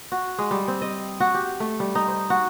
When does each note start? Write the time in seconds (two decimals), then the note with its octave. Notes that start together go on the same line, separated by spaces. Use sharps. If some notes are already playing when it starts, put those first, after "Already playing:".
0.12 F#4
0.39 G#3
0.51 G3
0.68 C4
0.82 D#5
1.20 F#4
1.35 G4
1.60 A3
1.80 G3
1.95 D#4
2.08 C5
2.30 F#4